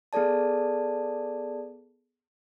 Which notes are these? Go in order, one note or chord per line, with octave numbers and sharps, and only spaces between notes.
B3 G#4 A4 D5 A5